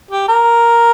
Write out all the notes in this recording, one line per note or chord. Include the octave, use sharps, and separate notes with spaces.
G4
A#4